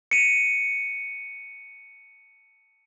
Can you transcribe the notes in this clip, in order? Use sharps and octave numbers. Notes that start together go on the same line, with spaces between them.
C#7 D#7